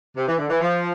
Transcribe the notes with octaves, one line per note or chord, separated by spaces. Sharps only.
C3
E3
D3
E3
F3